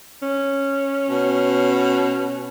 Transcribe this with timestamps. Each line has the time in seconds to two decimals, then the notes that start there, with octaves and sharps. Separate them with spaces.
0.22 C#4
1.09 B2